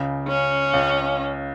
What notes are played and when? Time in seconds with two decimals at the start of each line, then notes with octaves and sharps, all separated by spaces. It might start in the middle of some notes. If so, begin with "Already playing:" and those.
Already playing: C#2 C#3
0.28 C#4
0.73 C#2 C#3